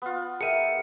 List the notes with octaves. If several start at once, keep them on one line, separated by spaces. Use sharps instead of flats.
B3 F4
G#4 A#4 E5 F#5 G5 C#7 D#7